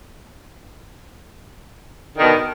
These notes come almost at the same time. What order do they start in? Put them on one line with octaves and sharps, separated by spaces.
D3 D#3 B2